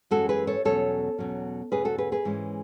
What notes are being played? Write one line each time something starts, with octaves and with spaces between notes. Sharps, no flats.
F#2 E3 G#3 F#4 A4
G#4 B4
A4 C#5
E2 B2 F#3 C#4 A4 C#5
E2 B2 F#3 C#4
E2 B2 A3 C#4 G#4 B4
F#4 A4
G#4 B4
G#4 B4
G#2 E3 G#3 C#4